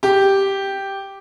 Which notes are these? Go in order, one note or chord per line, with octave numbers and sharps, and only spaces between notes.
G4